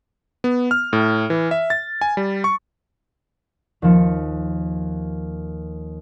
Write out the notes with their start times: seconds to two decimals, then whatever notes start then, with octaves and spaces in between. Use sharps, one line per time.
0.44 B3
0.71 F6
0.93 A2
1.30 E3
1.51 E5
1.70 A6
2.01 G#5
2.17 G3
2.44 C#6
3.82 D#2 F3 C#7